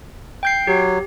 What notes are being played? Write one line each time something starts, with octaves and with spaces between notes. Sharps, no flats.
G5 G6 C7
F#3 G4